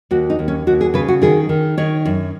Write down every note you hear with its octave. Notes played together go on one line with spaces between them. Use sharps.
D#2 F#4
D#4
D#2
C#4
D#2 F#4
G#4
C#3 B4
F#4
D#3 G#4
D#3
D#3 C#5
F#2